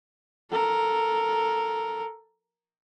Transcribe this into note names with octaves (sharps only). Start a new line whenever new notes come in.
A4 A#4